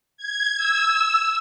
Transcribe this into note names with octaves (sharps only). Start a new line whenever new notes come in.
G#6
E6